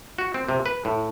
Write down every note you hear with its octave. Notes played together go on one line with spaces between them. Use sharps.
F#4
C4
C3
B4
A2